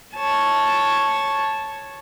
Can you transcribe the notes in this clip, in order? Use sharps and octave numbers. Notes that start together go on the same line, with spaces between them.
C#5 A5